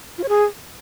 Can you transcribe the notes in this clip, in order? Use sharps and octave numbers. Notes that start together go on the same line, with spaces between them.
F4
C#5
G#4